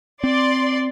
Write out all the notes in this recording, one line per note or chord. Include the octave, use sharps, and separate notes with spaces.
C4 D5 C6